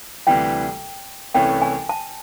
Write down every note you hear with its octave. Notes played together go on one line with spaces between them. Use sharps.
D2 C3 E3 G3 G5
C2 C3 E3 A3 C#4 G5
G#5
A5